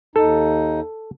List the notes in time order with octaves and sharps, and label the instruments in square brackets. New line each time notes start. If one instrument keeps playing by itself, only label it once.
[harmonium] D#2 D#4 [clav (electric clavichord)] A4